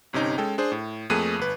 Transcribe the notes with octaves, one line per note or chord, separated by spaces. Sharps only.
G1 C3 C#4 D#4
G#3 C#4 A4 G5
D4 G#4 C5
A2
F2 A3 A#3 G#4 F#6 D#7
G1 B4